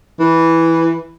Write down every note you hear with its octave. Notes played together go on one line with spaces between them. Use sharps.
E3